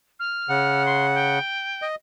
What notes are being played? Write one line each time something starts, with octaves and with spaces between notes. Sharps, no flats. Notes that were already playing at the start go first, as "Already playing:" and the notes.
F6
C#3 F#5
C6
G5
D#5